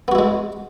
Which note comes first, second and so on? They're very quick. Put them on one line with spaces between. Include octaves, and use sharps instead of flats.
B3 F#4 E4 G#3